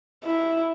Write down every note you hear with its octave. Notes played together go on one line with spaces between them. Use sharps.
E4